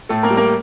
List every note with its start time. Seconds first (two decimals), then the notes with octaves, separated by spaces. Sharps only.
0.09 A2 A3 A4
0.23 A#3 A#4
0.30 G3
0.37 A#3 A#4